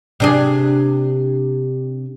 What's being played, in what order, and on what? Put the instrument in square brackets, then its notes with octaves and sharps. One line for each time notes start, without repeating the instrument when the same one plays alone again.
[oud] C3 D4 G#4